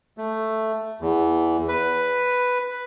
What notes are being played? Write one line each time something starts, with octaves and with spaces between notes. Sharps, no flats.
A3
E2
B4